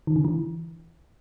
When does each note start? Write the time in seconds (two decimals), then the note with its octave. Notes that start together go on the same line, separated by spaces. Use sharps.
0.07 D#3
0.16 D3
0.25 E3